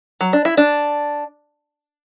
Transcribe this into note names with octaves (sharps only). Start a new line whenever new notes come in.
F#3
D4
E4
D4